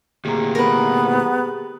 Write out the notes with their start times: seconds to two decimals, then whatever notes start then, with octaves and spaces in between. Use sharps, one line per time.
0.25 D2 A#2 G4 G#4 A#5
0.55 B3 A#4 B4